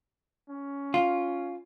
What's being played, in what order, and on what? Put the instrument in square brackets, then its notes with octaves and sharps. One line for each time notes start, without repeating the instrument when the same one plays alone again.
[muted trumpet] C#4
[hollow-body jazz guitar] F4